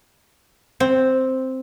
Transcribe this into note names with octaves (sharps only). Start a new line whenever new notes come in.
C4